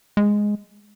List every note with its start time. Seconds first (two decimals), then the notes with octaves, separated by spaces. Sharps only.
0.17 G#3